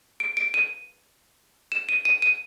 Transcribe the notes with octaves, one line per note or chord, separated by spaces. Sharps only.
D7
D7
D#7
E7
D#7
D#7
D#7